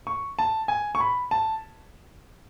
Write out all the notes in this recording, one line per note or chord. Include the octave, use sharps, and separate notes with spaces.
C#6
A5
G#5
C#6
B5
A5